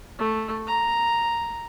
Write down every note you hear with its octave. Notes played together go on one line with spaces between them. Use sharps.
A3
A#5